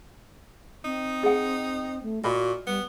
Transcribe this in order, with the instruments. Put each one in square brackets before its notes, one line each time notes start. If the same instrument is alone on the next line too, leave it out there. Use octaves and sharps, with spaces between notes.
[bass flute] C4 [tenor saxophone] D#4
[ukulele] G#4 F#5
[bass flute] A3
[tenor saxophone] A#2 [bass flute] F#4 [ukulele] D#5 B5
[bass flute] G3 [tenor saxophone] B3